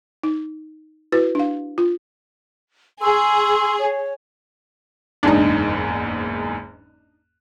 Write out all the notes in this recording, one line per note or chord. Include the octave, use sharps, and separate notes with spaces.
D#4
E4 F#4 B4
D4 F5
F4
G#4 C6 C#6 E6
C#5
F#1 E2 G#2 D4 D#4